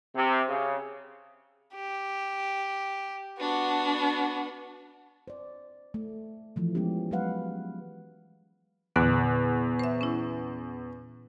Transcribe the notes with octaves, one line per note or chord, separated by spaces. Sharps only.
C3
C#3
G4
B3 D4 F#4
C5 D5
A3
E3 F3 A3
F3 G#3 B3 C#4 G4
F#3 G#3 B3 B4 F5 F#5
E2 A#2 D3 B3 F#6
C5 E5
C#4 E4